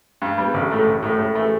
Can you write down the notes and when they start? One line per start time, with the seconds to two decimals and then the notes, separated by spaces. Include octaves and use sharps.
0.22 G2
0.38 G3 B3
0.54 A1
0.71 A2 A3
0.86 A1
1.03 A2 A3
1.19 A2
1.35 E3 A3